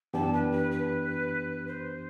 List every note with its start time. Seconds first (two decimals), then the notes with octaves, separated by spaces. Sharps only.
0.14 F#2 E3 B3 D4 G4 A5
0.33 B4
0.51 B4
0.71 B4
1.68 C5